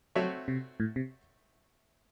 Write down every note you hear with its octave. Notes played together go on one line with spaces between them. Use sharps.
F#3 A3 C4 F#4 C#5 E5
C3
A2
C3